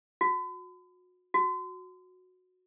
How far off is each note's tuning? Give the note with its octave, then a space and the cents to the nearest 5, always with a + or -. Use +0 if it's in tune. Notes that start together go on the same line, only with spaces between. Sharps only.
F#4 -35
F#4 -15